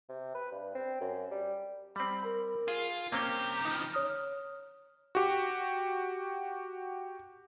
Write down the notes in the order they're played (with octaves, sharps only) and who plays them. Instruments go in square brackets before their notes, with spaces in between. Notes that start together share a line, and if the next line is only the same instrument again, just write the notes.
[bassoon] C3
B4
G2
C4
F#2
G3
[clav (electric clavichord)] G3 C4 [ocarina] B5
[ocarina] A#4
[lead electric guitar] F4 [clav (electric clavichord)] G#4
[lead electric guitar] C2 G4 [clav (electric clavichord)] A#3 C4 C#4 [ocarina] A#5
[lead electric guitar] C#3 F3 [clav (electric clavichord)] D#4
[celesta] C#5 D#6 F6
[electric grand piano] F#4 G4